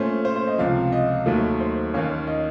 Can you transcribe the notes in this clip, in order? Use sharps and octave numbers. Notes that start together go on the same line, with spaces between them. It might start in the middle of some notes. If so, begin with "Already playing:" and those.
Already playing: A#2 A3 C#4 C5
C5
C5
D#5
C#2 C3 F3 F5
D#5
D#2 D#3 F#3 A3
C5
D#2 D#3 A#3 C#4 C#5
D#5